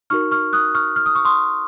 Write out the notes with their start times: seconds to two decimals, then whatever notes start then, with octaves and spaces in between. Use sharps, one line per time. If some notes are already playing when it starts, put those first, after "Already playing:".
0.10 D#4 F#4 A#4 C#6 F6
0.31 C#6 F6
0.53 D#6 F#6
0.75 C#6 F6
0.96 F6
1.06 D#6
1.15 C#6
1.25 C6 D#6